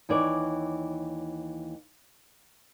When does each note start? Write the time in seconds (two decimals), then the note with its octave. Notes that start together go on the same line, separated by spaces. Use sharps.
0.09 D#2 E3 C#5 D5